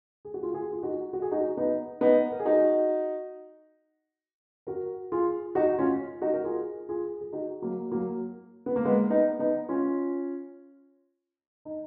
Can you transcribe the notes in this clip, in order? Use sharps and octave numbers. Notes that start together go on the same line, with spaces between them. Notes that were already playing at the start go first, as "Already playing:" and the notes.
G#4
F#4
F4 G#4
F4 G#4
F4
D#4 F#4
F#4
G#4
D#4 F#4
B3 D#4
B3 D#4
A#4
G#4
D#4 F#4
F#4 A#4
F4 G#4
D#4 F#4
C#4 F4
D#4 F#4
A#4
F4 G#4
F4 G#4
G#4
D#4 F#4
F#3 A#3
F#3 A#3
B3
A#3
G#3 B3
B3 D#4
B3 D#4
C#4 F4
D#4